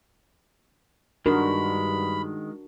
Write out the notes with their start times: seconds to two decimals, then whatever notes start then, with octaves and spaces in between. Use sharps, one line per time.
1.26 G2 D#3 G#3 D4 F#4 A#4 B5